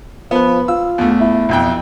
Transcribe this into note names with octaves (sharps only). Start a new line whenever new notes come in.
F3 B3 B4
F4 E6
E2 A3
E4
B1 F2 G5